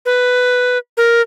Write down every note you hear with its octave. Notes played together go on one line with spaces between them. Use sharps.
B4
A#4